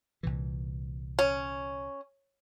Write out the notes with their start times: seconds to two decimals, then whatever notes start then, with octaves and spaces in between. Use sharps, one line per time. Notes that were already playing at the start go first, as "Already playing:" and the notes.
0.23 C2 A#2 E3
1.19 C#4